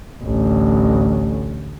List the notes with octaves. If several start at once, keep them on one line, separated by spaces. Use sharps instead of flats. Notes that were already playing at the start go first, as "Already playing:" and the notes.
A1 D2